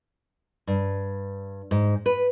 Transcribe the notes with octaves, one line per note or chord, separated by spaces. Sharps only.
G2
G#2
B4